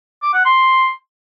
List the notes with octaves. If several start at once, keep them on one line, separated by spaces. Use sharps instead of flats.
D6
F#5
C6